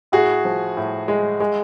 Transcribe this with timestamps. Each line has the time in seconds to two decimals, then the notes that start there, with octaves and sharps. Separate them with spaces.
0.12 A2 F#4 G#4
0.45 F3
0.77 A2
1.08 G#3
1.40 G#3